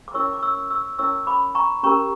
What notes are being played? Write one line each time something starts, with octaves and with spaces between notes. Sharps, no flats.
D6
C#4 E4 A#4 C#5 C#6 E6
D6
C#6 E6
C#6 E6
C#4 E4 A#4 C#5 C#6 E6
B5 D6
A#5 C#6
C#4 G4 A#4 A#5 C#6